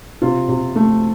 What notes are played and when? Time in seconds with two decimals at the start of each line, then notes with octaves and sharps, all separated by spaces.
0.22 C3 F4
0.48 C3
0.76 A3